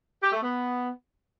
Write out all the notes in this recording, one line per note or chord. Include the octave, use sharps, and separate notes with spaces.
G4
A3
B3